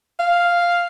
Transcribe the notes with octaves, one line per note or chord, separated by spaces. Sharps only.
F5